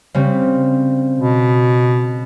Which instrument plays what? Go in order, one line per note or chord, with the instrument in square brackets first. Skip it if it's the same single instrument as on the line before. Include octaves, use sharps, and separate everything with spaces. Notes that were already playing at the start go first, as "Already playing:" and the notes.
[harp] C#3 G3 C4
[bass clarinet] B2